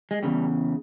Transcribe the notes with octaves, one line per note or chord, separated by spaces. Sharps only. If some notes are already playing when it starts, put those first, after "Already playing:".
G#3
E2 C#3 G3